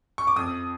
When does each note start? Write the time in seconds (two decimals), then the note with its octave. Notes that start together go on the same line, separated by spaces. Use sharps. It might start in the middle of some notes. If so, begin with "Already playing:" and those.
0.18 C#6
0.27 D6
0.36 F2 D#6